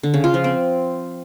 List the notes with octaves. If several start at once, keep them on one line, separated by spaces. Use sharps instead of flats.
D3
C#3
F4
F3
C4